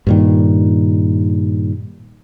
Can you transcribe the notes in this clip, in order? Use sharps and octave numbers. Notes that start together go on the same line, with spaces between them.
G2 A#2 D#3